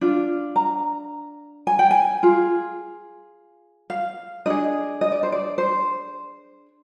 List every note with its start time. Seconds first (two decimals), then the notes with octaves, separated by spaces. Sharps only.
0.01 D4 F4
0.56 A#5
1.67 G#5
1.79 G5
1.91 G#5
2.23 F4 G#4
3.90 F5
4.46 D4 G#4 D#5
5.01 D#5
5.12 D5
5.23 C5
5.32 D5
5.58 C5